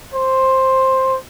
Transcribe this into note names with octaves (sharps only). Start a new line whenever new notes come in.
C5